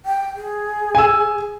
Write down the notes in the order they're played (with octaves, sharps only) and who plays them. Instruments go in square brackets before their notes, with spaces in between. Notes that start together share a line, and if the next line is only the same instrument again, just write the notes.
[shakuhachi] G5
G#4
[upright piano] G#5 E6